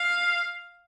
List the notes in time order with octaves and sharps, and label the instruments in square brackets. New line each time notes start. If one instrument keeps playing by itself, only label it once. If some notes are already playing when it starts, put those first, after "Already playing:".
Already playing: [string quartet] F5